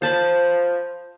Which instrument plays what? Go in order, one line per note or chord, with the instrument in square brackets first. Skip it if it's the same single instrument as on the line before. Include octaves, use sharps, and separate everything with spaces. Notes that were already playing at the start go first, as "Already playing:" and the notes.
[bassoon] F3 [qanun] C5 A5 B5